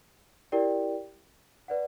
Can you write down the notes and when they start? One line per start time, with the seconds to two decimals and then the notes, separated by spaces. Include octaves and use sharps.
0.52 E4 G4 A#4 D5 G5
1.68 B4 D5 F#5